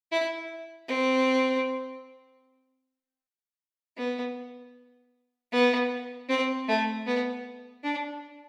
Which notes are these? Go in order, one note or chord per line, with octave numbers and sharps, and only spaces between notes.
E4
C4
B3
B3
C4
A3
B3
D4